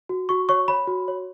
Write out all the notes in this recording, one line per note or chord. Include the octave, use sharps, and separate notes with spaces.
F#4
F#4 C#6
C#5 C#6
C#5 B5
F#4
C#5